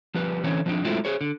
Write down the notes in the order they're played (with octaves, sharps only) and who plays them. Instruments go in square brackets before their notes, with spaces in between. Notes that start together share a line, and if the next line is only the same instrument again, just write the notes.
[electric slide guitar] F3 G3 B3 B4
D3 E3 C4 C#4 C#5
F3 B3 C4 D4 D#4
F#3 G#3 A3 C4 E4 F4
G#4 C5 C#5
D3